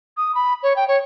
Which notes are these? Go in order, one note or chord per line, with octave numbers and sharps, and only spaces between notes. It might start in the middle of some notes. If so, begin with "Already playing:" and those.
D#6
B5
C#5
G5
C#5